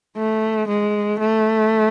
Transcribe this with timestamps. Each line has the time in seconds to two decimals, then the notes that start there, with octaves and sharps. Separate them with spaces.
0.16 A3
0.68 G#3
1.19 A3